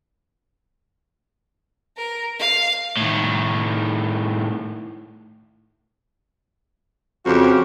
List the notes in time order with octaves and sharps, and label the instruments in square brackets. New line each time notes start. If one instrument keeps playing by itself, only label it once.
[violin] A#4
F5
[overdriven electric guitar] A2 D#3
[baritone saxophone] F2 [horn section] C#3 F#4 G4